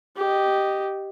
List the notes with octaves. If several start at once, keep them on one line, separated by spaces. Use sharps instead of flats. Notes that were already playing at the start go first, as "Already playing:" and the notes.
G4 D#5